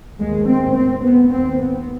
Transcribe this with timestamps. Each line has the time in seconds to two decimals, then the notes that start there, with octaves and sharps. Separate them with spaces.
0.19 D#2 G#3
0.47 C4
0.75 C4
1.03 B3
1.32 D#2 C4
1.59 B3